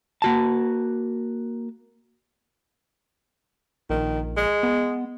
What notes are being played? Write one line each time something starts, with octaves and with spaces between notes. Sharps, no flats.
A#3 F#4 A5
A#1 D#3
G#3
B3